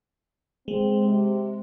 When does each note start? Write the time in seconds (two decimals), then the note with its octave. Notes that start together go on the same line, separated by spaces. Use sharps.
0.68 G#3 C4
1.05 C3